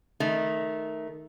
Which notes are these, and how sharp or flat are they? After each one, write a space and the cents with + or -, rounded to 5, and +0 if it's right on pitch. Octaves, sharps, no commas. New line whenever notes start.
D#3 +0 A3 -15